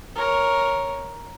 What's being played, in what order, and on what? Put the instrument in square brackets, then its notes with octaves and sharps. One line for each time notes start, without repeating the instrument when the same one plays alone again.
[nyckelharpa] A#4 C#5